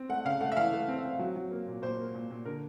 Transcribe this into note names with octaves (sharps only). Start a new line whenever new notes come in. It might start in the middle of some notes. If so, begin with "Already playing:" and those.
Already playing: C4
A3 F#5
C#3 F5
A3 F#5
E5
E3 F5
A3
C4
C4
F#3
F#3
A#3
A#2
A#2 C5
A#3
A#2
A#2
D3 A#4